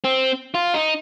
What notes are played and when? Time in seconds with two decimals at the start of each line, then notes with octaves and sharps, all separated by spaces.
0.04 C4
0.54 F4
0.74 D#4